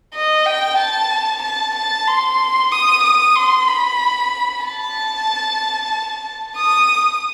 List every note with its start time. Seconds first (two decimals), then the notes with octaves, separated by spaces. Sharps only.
0.14 D#5
0.46 G5
0.78 A5
1.42 A5
1.75 A5
2.07 C6
2.72 D#6
3.03 D#6
3.35 C6
3.68 B5
4.64 A5
6.57 D#6